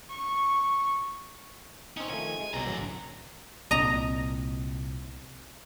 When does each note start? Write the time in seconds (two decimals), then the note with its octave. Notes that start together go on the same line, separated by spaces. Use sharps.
0.10 C#6
1.97 C4 C#4 D#4
2.10 D#3 F3 A3 G#5
2.40 G#3
2.54 C2 B2 D3 F#3 A#5
2.67 A1 F#2
3.71 C2 A#2 C4 D#5 A#5